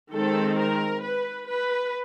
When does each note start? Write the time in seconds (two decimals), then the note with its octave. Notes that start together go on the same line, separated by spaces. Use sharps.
0.13 D#3 G#3 C4 A4
0.58 A#4
1.02 B4
1.47 B4